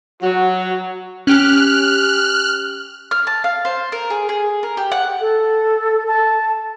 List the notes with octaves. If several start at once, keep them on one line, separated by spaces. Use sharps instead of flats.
F#3 F#4
C#4 G4 F6 F#6
F6
A5
F5
C5
A#4
G#4
G#4
A#4
G4
F#5
A4
A5